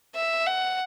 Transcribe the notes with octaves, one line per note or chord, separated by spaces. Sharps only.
E5
F#5